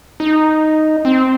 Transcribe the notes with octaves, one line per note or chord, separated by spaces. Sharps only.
D#4
C4